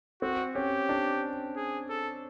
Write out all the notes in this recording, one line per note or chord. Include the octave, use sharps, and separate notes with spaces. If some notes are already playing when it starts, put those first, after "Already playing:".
C4 F#4
C#4 G4
D4
G#4
A4